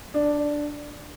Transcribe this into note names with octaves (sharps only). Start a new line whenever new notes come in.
D4